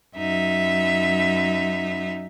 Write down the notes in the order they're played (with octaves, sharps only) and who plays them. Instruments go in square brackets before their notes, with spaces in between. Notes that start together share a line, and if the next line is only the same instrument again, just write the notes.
[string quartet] F#2 D#4 E5